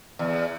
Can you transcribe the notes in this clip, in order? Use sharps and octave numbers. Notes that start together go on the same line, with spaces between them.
E2